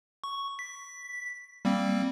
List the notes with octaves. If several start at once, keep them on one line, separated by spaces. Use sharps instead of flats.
C#6
B6
G3 A#3 C4